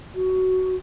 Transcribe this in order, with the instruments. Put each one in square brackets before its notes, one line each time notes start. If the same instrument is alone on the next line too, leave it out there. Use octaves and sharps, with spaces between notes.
[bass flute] F#4